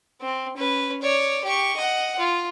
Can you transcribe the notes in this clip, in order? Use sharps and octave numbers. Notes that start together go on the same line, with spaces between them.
C4
C#4 B4
C#5 D5
G4 C#6
D#5 F#5
F4